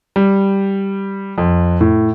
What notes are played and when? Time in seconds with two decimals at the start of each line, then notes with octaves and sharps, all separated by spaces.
0.16 G3
1.38 F2
1.81 A2